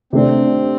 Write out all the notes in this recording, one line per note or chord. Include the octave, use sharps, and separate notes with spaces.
C3 A3 C4 D4 G4 D5